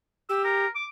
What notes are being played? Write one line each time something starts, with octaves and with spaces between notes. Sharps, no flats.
G4 E6
A#4
D6